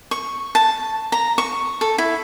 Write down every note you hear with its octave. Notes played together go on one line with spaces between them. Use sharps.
C#6
A5
A#5
C#6
A4
E4